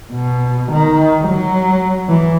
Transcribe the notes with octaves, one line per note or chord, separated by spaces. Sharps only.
B2
D#3
F#3
E3